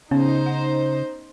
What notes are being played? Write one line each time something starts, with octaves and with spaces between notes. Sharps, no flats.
C#3 B3 C#4 D#4 C5
F#5